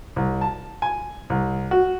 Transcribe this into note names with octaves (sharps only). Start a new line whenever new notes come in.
C2
A5
G#5
C2
F#4